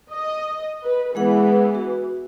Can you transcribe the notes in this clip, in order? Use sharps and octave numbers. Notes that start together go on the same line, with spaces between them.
D#5
B4
E3 G#3 B3 G#4 F#5
F#4